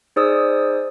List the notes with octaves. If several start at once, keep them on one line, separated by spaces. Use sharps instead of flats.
D#4 G#4 C5 D5 D#6 E6